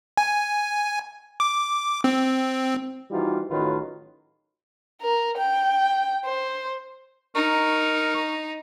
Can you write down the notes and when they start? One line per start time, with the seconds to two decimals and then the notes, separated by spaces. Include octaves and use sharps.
0.17 G#5
1.40 D6
2.04 C4
3.11 E3 F3 G3 D#4 F4 F#4
3.50 A1 A2 D#3 F#3 F4 B4
5.01 A#4
5.37 G5
6.25 C5
7.35 D#4 A#4 C#6